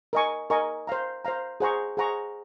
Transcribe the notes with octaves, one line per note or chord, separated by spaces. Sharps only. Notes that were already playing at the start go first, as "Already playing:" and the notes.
A#4 D#5 G#5 C#6
A#4 D#5 G#5 C#6
C5 F5 A#5
C5 F5 A#5
G#4 C5 F#5 A#5 C#6
G#4 C5 F#5 A#5 C#6